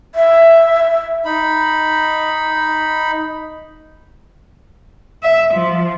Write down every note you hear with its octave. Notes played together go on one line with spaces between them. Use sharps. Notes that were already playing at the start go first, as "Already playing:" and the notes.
E5
D#4 B5
E5
F3